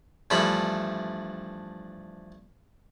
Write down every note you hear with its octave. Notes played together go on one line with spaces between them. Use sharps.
G2 E3 F3 A3 D4 B5